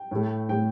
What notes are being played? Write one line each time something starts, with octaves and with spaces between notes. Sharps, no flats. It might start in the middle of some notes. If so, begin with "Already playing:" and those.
Already playing: G5
A2 A3
A2 A3 G5